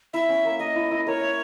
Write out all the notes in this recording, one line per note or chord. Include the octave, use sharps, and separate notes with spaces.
E4 E5
C#4
A#3
A#3 D#5
E4
E4
A#4 C#5
E5